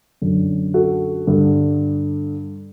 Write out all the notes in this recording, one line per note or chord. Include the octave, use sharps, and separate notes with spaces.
F#2 D3
F#4 A4
G2 D3